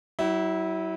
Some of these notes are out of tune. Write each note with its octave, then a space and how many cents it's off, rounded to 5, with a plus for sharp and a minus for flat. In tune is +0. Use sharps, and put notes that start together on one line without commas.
F#3 +35 E4 -20